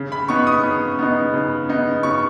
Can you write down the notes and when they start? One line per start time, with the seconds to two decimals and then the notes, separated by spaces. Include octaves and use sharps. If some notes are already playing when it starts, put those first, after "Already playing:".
Already playing: C#3
0.12 B5
0.29 B3 D#4 C#6
0.47 D#6
0.63 C#3
0.99 B3 D#4
1.33 C#3
1.69 B3 D#4
2.03 C#3 C#6